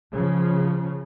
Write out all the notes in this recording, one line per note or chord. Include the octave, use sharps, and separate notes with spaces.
C#3 F3